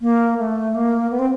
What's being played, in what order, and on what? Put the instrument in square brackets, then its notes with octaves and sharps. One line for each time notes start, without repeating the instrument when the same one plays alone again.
[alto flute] A#3
A3
A#3
B3
C4